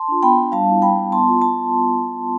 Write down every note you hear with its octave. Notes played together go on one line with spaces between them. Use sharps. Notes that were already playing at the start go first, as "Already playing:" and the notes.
Already playing: A5 C6
D4 F4
B3 G5 B5
F4
D4
G3 F5 A5
B3 E4
G3 G5 B5
B3 E4
B3 A5 C6
F4
A5